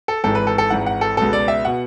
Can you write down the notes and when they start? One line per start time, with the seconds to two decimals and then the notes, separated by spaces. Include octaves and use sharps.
0.08 A4
0.24 G#1 G#2 E3 A4
0.35 B4
0.47 A4
0.58 A4
0.70 G#1 G#2 E3 F#5
0.86 F#5
1.01 A4
1.17 C#2 B2 A4
1.33 D5
1.48 E5
1.65 B2 F#5